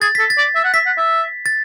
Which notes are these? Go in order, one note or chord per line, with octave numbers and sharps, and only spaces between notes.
G#4 A6
A4 B6
A6
D5
E5
F#5
E5 B6
F#5
E5
A6